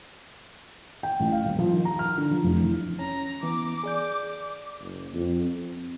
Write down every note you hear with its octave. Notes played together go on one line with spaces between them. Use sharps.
G5
A1
F5
D#1
F3
D#3
A#5
F6
D3
F3
F1
E3
C#4 A#5
E3 B3 D6
G#4 D5 G6
F#1
F2
C4